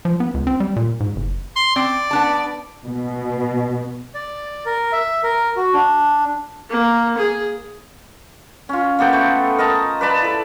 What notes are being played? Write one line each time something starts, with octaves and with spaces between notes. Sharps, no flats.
F3
B3
C#2
C4
G3
A#2
G#2
F#1
C6
C4 D5
B3 D4 A5
B2
D5
A#4
E5
A#4
F#4
D4
A#3
G#4
C#4 F4
A#3 B3 A4 G5
A3
A#4 D#5 A5 A#5
B4 D5 A5 B5
E4 A4